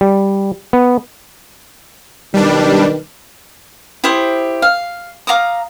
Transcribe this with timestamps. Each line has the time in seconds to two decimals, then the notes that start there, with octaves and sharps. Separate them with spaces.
0.01 G3
0.73 B3
2.34 B1 D#3 G3 D4 B4
4.04 E4 G4 C5 D#6
4.62 F5
5.27 F5 A#5 D6 D#6